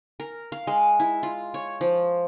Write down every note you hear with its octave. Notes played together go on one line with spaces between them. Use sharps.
A#4
F5
G#3
E4
F4
C#5
F3